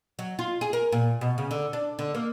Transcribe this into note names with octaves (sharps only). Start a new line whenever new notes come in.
F#3
F4
G#4
A#4
A#2
B2
C#3
D3
D4
D3
A#3